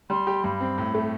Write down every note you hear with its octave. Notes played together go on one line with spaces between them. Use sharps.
G3 C6
G4
G2 B5
C4
A2
A3